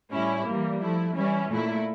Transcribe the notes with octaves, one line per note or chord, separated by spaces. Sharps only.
A2 G3 C#4 E4
E3 G3 A#3
F3 A3 E4
E3 G3 C#4 E4
A#2 A3 E4